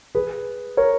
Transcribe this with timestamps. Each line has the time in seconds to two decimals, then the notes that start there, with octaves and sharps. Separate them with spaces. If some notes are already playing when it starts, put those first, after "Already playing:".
0.15 G#4 B4
0.77 A#4 C#5